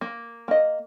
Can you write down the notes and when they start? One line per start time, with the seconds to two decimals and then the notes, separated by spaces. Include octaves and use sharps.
0.01 A#3
0.48 A#3 D#5